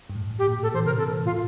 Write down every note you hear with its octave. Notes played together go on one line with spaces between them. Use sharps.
G2
A2
A2
G4
A#2
A2 A4
E3 C5
C3 A#4
C3 A4
A#2
A2 F4
A#2